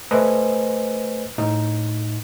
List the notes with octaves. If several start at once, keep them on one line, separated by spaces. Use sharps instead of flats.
A3 B4 C5 D#5 G#5
A2 D#4